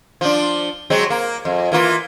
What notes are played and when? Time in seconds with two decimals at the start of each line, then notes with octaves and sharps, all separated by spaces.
0.21 F3 D4
0.90 F#3 G#3 C4
1.10 A#3
1.45 F2
1.72 E3 A#3 F4